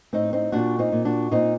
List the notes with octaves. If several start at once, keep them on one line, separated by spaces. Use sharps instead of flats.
A2 C4 D#4
C4 D#4
A#2 D4 F#4
C4 D#4
A#2
D4 F#4
A#2 C4 D#4